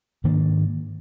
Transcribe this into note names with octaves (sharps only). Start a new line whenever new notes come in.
G#2 D#3 A#3 D4